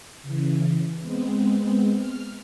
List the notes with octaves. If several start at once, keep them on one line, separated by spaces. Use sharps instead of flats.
C#3 E3
G#3 B3 C4
F6